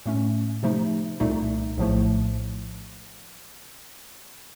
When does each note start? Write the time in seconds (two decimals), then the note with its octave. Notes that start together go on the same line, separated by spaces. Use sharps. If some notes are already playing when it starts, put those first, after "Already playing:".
0.06 A2 A3 C#4
0.63 C3 F3 A3 D#4
1.20 C2 A#2 A3 D#4
1.77 A#1 A2 F3 A3